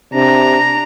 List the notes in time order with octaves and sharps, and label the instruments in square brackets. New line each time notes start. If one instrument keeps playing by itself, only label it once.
[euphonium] C3 [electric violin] D4 A#5